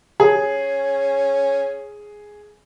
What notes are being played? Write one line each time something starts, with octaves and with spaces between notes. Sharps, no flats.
C#4 G#4